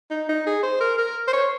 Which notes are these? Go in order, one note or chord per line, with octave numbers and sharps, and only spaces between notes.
D#4
D#4
G#4
C5
A#4
A#4
C5
C#5